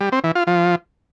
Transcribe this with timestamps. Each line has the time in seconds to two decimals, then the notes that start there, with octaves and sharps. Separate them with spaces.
0.01 G3
0.12 C4
0.24 E3
0.35 F4
0.47 F3